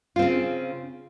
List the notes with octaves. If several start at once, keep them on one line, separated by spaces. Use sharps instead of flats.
C#3 C4 F4